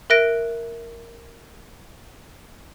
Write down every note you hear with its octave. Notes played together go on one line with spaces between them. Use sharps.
A#4 E5 F#6 A#6 D7